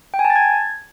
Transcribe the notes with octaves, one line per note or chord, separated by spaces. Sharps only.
G5
G#5
A5
A6
G#6